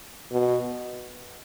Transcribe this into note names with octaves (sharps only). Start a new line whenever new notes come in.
B2